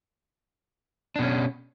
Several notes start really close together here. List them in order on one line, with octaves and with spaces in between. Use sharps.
D4 B2 C#4